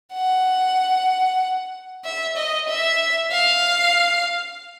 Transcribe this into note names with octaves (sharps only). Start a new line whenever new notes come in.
F#5
E5
D#5
E5
F5